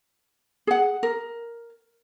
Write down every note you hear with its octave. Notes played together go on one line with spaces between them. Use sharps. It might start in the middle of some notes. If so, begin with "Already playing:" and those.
G#4 F#5
A#4